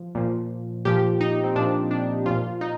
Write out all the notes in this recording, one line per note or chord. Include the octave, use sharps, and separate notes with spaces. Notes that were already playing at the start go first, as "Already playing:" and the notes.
Already playing: F3
A#2 F3
A#2 F3 G4
D#4
C4
A#2 F3 D4
D4
A#2 F3 F4
D#4